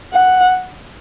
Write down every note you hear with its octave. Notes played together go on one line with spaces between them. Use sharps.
F#5